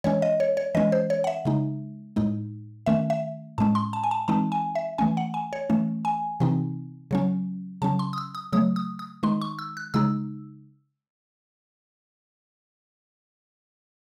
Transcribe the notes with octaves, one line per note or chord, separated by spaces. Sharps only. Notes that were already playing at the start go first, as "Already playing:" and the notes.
E3 G#3 C#4 C#5
D#5
C#5
C#5
E3 G#3 C#4 D#5
C5
C#5
F#5
E5
C#3 G#3 D#4
A2 G#3 D#4
D#3 A3 C#4 E5
E5
A2 G#3 C#4 A5
C6
A5
G#5
A5
E3 G#3 C4 D#4 A5
G#5
E5
E3 A3 C#4 G#5
F#5
G#5
C#5
E3 A3 C#4
G#5
C3 E3 C4 D#4
C#3 F#3 C#4
C#3 F#3 C#4 A5
C6
D#6
E6
D#6
C#3 F#3 A3 D#6
D#6
D#6
D#3 G#3 D#4 C6
C#6
E6
F#6
C#3 G#3 D#4 E6